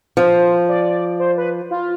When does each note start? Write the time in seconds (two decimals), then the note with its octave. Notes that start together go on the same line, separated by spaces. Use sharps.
0.17 F3 C5
0.69 D5
1.19 C5
1.37 B4
1.70 F4